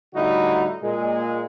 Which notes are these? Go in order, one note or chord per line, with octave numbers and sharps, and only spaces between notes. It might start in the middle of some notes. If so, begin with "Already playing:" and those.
A2 D3 G3 D#4 E4 F#4
A#2 G#3